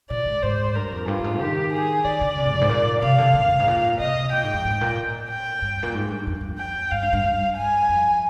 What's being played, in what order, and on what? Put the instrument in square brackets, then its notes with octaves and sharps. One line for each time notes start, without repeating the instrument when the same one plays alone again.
[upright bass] A#2 [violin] D5
[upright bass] G#2
[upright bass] G#2 [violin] C5
[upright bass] G2 [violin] A#4
[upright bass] F2
[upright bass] G2 [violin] F4
[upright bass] G2
G#2
[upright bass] D#3 [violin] G4
[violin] G#4
[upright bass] D#3 [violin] D5
[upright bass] D3
C3
G#2
F2
G#2
A#2
[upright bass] C3 [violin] F5
[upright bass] D3
D3
F2
G2
G#2
A#2
[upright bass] C3 [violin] D#5
[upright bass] A#2 [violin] G5
[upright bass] G#2
F2
G#2
A#2
[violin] G5
[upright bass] G2
A#2
G#2
G2
F2
F2
[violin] G5
[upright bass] G2 [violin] F5
[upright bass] G2
G2
G2
[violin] G#5
[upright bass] F2